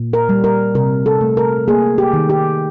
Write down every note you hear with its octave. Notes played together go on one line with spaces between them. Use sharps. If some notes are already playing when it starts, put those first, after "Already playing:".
Already playing: A#2
A#4
G3
A#4
C3 A#4
A4
A3
A#4
A#3 G#4
G4
D#3
G4